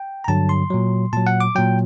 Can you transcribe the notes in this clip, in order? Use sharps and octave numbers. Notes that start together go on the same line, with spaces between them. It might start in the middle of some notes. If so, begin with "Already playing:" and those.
Already playing: G5
A#5
G2 D3 F#3 A5
C6
A#2 F#3
A#2 F#3 A5
F#5
D6
A#2 F#3 G5